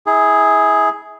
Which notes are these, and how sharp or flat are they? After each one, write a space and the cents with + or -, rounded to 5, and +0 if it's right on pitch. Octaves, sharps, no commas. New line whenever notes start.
E4 -35 G#4 +0